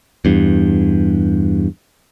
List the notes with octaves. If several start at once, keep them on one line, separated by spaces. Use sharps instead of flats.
E2 G2